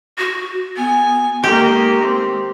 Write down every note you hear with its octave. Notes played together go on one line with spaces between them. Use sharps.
F#4
B3 G#5
D#3 G#3 A#3 G4
C4